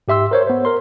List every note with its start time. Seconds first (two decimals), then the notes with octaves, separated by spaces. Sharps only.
0.08 G#2 G4 E5 C6 E6
0.31 A#4 C5 C#5
0.47 B3 C5
0.65 A#4 C6